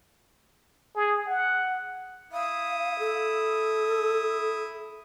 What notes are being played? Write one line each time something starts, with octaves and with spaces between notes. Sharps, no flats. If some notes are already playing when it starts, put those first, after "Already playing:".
G#4
F#5
E4 F5 D#6
A4